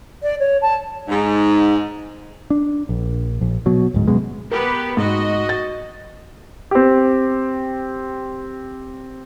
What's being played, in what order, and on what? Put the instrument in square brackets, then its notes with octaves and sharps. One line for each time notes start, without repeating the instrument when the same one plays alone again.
[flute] D5
C#5
A5
[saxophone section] G#2
[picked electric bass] D4
A#1
A#1
B2 F#3
D1 G#2
F#2 B2 G#3
[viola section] B3 G4 B4 [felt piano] A#4
[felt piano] G#2 [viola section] F#4 D#5
[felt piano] A6
[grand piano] C4 G4